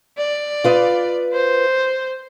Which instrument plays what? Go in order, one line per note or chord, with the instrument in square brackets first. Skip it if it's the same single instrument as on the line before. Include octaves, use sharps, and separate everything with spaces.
[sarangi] D5
[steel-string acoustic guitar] F4 B4 D#5
[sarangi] C5